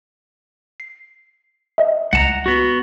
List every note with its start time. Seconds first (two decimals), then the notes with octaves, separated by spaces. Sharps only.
0.80 C7
1.78 D#5 E5
2.13 C#2 F#5 A5 A#5
2.46 B3 F#4